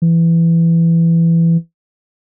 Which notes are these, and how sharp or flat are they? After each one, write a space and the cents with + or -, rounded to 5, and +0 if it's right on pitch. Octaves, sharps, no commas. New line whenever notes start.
E3 +15